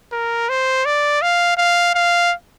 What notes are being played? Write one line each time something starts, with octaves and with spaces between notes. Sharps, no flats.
A#4
C5
D5
F5
F5
F5